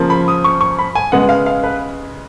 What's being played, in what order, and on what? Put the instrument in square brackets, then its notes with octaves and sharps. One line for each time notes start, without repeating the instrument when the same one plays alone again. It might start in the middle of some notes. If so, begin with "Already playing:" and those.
Already playing: [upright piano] C#3 F3 A#3
B5
D#6
C#6
C#6
B5
G#5
C#3 G#3 B3 F#5
F5
F5
B4